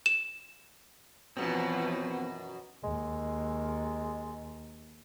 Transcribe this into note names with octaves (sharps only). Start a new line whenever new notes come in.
E7
F#2 B2 E3 F3 B3 C4
D#2 G#3